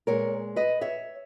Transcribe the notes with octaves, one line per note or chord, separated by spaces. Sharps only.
A#2 G#3 B3 A#4 C#5
B4 D#5
C#5 E5